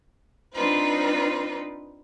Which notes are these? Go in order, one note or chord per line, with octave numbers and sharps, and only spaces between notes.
C4 D4 D#4 F4 B4 C5